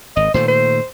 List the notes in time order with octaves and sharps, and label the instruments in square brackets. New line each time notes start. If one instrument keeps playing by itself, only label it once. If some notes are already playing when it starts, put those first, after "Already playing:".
[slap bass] G#1 [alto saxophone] D#5
[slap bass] A#2 D#3 A3 [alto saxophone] C5
[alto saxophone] C5